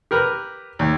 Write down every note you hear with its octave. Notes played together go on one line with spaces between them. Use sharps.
G4 A#4 B4
D#2